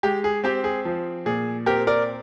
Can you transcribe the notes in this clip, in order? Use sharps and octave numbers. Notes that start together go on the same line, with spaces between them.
G#3 G4
G#4
C4 G4
G#4
F3
A#2 G#4
C4 G4 A#4
A#4 D5